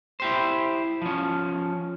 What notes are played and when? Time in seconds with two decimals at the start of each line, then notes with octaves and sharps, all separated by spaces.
0.20 E4 G4 C5
1.02 F3 C#4